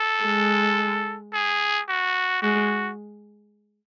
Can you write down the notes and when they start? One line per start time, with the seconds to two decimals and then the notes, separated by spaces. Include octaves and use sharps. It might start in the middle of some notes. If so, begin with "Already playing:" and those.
Already playing: A4
0.24 G#3
1.33 G#4
1.88 F#4
2.42 G#3 F#4